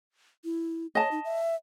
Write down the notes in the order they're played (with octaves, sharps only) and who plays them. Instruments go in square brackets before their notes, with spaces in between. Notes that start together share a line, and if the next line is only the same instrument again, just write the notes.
[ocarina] E4
[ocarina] C#5 [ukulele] D#5 A5
[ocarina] D#4
E5